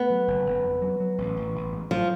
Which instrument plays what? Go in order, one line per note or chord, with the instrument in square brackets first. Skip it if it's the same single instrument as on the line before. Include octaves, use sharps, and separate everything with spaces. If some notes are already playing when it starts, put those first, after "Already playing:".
Already playing: [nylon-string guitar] B3
[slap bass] F#3
F#1
F#1
F2
F#3
F#3
A1
A1
A1
G#2
[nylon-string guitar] F3 [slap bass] F#3